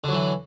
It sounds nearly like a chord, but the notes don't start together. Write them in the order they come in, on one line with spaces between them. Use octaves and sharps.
D3 F#3 E3